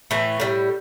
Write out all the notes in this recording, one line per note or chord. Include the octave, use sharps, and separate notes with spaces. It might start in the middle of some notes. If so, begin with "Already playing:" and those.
A2 E3 A3
A2 G3